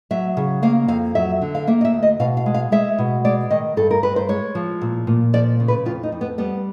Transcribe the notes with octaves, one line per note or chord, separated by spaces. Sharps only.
F#3 E5
C#3
A#3 F5
F2 F5
F#3 E5
D3
F5
A#3 E5
D#5
E5
D2
D#5
B2 F5
F5
G#3
F5
G#3 E5
B2
G#3 D5
D#3 D#5
G2 A4
A#4
G2 B4
C5
G#3 C#5
F3
A#2
A#2
F3 D5
C#3
B4
F2 F4
D#4
F2
B3
G3 B3